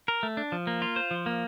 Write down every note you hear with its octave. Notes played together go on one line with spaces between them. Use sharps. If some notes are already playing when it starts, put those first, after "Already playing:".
A#4
A3
D4
F3
A#3
F4
C5
F3
A#3